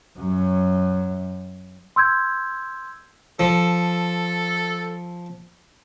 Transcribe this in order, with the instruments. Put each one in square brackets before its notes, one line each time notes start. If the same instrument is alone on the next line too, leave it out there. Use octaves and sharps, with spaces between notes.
[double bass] F#2 F#3
[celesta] C6 E6 G6 G#6
[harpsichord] F3 [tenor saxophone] A4